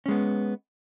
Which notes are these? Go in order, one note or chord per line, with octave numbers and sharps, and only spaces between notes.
G#3 B3 C#4